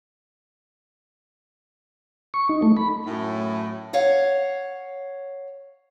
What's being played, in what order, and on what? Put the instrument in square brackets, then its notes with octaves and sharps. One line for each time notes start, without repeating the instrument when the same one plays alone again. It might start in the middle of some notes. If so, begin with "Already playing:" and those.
[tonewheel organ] C#6
D#4
A3
B5
[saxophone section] F#2 A2
[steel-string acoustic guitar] C#5 F5 F#5